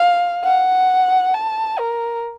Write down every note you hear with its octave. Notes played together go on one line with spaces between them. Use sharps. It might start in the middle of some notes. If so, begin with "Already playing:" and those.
Already playing: F5
F#5
A5
A#4